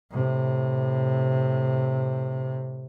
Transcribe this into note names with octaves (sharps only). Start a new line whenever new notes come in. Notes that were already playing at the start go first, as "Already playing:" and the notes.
A2 C3